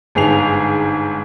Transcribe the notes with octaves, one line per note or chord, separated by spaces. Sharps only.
G1 G#2 G#4 C7 F7